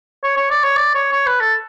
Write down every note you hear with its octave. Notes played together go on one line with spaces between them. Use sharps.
C#5
C#5
D5
C#5
D5
C#5
C#5
B4
A4